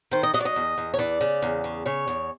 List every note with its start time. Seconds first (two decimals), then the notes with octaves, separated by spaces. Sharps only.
0.11 D#3 C5
0.23 D#5
0.34 F#3 D#5
0.40 D5
0.45 D#5
0.56 E2
0.78 E2
0.94 C#5
0.99 E3 D5
1.21 C#3
1.42 E2
1.64 C#3
1.86 C#3 C#5
2.08 E2